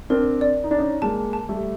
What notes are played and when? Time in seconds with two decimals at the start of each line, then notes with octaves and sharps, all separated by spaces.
0.10 C4 D4 A#4
0.41 D5
0.64 D#4
0.71 D4 D5
0.78 C#4 D#4
1.02 G#3 A#3 A5
1.33 A5
1.49 G3 A3